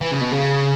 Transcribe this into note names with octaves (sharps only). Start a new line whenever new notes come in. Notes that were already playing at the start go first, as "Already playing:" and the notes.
E3
C#3
B2
C#3